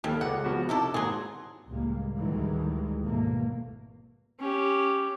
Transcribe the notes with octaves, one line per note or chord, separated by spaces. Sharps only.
D#2 C#3 G3 A4 F6
C#2 G#3 F#5 D6
F3 B3 F#4
C3 D#4 E4 A4 D6
G#1 F#3 A#3 G#4 C6
C#2 A2 G3 G#3 A#3
D2 D#3 E3 G3 G#3
G#1 E2 B2 A3 A#3
C#4 G4